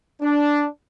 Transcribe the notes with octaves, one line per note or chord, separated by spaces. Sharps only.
D4